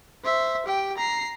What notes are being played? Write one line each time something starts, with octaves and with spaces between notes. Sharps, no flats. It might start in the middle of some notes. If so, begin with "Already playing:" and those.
C5 E5
G4 G5
A#5 C7